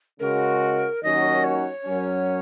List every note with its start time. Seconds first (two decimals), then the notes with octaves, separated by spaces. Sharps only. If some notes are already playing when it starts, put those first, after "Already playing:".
0.20 C#3 G#3 F#4 A#4
1.03 D#2 D#3 F#3 C#4 F#4 D#5
1.44 C#5
1.85 F#2 F#3 C#4